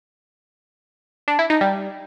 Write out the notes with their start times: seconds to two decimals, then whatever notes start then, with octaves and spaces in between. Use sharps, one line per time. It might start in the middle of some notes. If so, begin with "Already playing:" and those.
1.28 D4
1.39 E4
1.50 D#4
1.61 G3